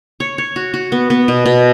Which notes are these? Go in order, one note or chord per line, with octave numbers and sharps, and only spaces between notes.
C#5
C#5
F#4
F#4
B3
B3
B2
B2